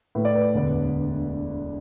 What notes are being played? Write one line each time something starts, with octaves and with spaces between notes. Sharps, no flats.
A2 A3 E4 B4
D5
B4
E1 D2 D3 B3 D4